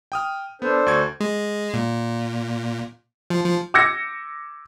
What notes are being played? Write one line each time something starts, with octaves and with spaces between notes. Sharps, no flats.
G5 D#6 F6
B3 D4 A4 C5
D2 C#6 G#6
G#3
A#2
F3
F3
D6 E6 G6 G#6 A#6 C#7